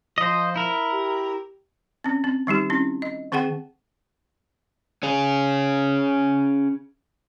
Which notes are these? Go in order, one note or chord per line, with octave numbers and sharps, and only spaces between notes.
F3 C5 D#5
E4 A#4
G4
C4 C#4
C4
D#3 G3 D#4 G4
C4 C#4 E4
D#5
D#3 C4 G#4 F#5 G5
C#4 G#4